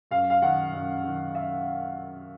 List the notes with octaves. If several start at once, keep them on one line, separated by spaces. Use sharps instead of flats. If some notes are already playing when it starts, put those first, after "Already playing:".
F#2 F5
F5
D#3 F#5
F#2
D#3
E5